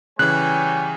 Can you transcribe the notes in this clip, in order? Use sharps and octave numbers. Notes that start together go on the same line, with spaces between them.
C#3 E3 G3 C#5 G#5 F#6